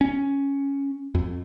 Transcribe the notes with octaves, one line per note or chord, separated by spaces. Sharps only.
C#4
F2